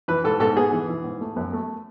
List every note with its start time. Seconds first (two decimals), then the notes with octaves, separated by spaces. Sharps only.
0.08 E3 B4
0.24 G#2 A4
0.40 G#2 A4
0.56 B3 G#4
0.72 E3
0.88 E3
1.04 G#2
1.21 A3
1.36 F#2
1.53 A3